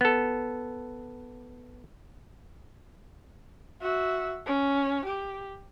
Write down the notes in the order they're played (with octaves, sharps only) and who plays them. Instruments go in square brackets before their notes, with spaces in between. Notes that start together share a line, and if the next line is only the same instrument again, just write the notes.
[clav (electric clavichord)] B3 A4
[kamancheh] F#4 E5
C#4
G4